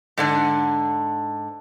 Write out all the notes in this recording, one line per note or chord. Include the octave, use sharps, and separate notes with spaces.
G#2 D3 D4